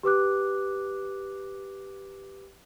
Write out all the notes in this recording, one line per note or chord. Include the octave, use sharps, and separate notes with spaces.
G4 B4 D6 F#6